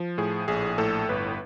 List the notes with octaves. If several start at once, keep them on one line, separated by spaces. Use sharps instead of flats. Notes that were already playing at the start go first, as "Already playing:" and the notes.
Already playing: F3
A2 G#4
A#1 G#4
A2 A4
G1 B4